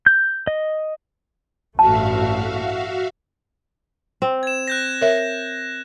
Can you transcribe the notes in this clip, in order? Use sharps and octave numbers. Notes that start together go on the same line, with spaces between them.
G6
D#5
A1 G2 A3 F#4 E5 F5 A5
C4
G#6 E7
F#6 G6 A#6
A#4 C#5 E5